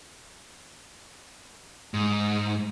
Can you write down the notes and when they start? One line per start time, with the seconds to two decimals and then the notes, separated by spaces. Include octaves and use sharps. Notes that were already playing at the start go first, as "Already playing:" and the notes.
1.94 G#2